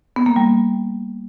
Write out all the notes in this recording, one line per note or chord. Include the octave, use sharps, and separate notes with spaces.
B3
A#3
G3